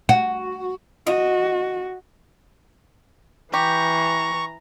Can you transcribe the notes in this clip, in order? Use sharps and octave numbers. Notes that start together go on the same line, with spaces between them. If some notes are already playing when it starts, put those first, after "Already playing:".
F#4
F#4 D#5
E3 G4 A#5 C#6